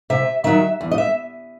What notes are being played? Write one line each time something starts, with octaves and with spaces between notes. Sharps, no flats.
C3 E5
D#3 F#3 E5
E2
D#5
E5